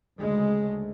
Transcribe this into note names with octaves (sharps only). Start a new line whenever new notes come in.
D2 C#3 G#3
D2